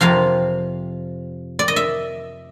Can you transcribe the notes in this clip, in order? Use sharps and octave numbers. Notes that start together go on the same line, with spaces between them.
F2 C3 F3 F5
D5
D#5
E5